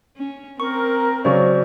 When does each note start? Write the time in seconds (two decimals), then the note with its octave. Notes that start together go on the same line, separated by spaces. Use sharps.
0.17 C#4
0.60 C4 A#4 C#6
1.25 C#3 F#3 C5 D5 C#6